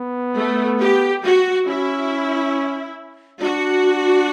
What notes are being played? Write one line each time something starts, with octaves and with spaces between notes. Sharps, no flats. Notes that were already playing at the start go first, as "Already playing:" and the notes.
Already playing: B3
A3
G4
F#4
C#4 E4
D4 F#4